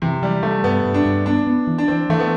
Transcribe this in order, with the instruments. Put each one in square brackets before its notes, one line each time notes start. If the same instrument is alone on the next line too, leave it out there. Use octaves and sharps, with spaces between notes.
[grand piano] C3 [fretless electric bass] E3
[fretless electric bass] E3 [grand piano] G3
[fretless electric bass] G3 [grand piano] A3
[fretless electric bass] G2 [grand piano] B3
[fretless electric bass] G2
[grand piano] D4
[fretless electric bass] G2
[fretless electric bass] B3 [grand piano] D4
[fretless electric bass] B3
E3
[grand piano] D4
[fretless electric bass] E3 [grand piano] C4
[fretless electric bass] E3 [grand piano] A3
[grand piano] B3